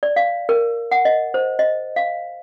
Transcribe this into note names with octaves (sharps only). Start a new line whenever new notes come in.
D5
F5
A#4
F#5
D#5
C5
D#5
F5